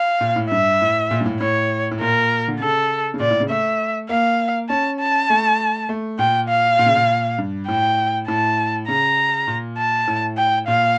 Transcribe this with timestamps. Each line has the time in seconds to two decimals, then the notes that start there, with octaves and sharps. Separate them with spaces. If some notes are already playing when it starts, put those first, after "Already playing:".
Already playing: F5
0.21 A#2
0.36 A2
0.50 G2 E5
0.81 A2
1.11 A#2
1.20 G2
1.26 A2
1.40 A2 C#5
1.91 A2
2.00 A#2 A#4
2.48 D3
2.60 C#3 A4
3.14 C#3
3.20 A#2 D5
3.31 A2
3.40 C#3
3.50 A3 E5
4.09 A#3 F5
4.69 C#4 A5
5.00 A5
5.30 A3
5.89 A3
6.19 A#2 G5
6.49 F5
6.79 A#2
6.86 C#3
6.95 A#2
7.38 G2
7.68 A2 G5
8.28 A2 A5
8.88 C#3 A#5
9.47 A#2
9.78 A5
10.07 A2
10.38 G5
10.67 A#2 F5